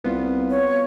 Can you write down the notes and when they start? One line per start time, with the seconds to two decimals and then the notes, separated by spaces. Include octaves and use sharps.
0.04 C2 B3 F4
0.50 C#5